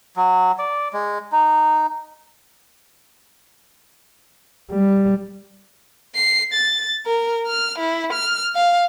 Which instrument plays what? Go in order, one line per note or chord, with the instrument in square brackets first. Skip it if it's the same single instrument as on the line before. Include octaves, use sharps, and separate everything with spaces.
[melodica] F#3
D5
G#3
D#4
[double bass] G3
[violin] C7
A6
A#4
F6
E4
F6
F5